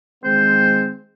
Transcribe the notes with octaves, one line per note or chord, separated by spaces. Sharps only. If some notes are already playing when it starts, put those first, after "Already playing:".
D#3 G#3 C4 C5